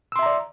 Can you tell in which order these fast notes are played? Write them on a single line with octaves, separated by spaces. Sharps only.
E6 C6 E5 A#5 D5